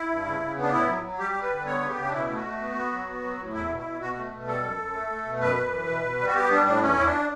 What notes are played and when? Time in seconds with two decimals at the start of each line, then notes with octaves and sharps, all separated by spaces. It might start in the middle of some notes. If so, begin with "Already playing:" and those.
Already playing: E4
0.10 G2
0.26 C#3
0.41 C#3
0.57 B3 D4
0.73 A2 E4
0.88 F#3
1.03 F#3
1.19 G3 G4
1.34 G3
1.42 B4
1.50 D3
1.66 B3 C#5
1.81 C#3
1.89 G4
1.97 C#3
2.06 D4
2.12 B2 E4
2.28 A3
2.37 F#4
2.44 A3
2.60 B3
2.75 B3
2.91 F#3
3.07 B3
3.22 F#3
3.38 A2
3.53 E2 E4
3.69 B2
3.77 E4
3.84 B2
4.00 B2 F#4
4.16 A3
4.31 B2
4.47 G3 A4
4.63 F#2
4.78 F#2
4.94 A3
5.10 A3
5.25 B2
5.41 F#2 B4
5.57 F#2
5.72 E3
5.88 B2
6.03 B2
6.19 G3
6.27 F#4
6.35 B3 G4
6.50 G3 D4
6.66 A2 D4
6.81 E2 C#4
6.97 E2 E4
7.05 D4